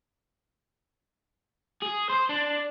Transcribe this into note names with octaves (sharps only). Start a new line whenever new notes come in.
G#4
C5
D4